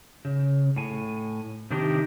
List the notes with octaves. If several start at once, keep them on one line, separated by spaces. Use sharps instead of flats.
C#3
A2 G#5
C3 D#3 D4 D#4 G4 A#4